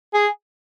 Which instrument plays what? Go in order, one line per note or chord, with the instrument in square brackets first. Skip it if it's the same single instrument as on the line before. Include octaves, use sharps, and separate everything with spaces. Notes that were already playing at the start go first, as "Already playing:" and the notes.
[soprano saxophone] G#4